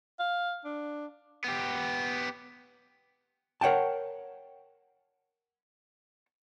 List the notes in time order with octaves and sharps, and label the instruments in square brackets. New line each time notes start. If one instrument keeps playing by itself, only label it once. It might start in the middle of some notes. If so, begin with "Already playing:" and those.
[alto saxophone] F5
D4
[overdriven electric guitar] B3 G4
[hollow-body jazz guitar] A#4 C#5 F#5 G5 A5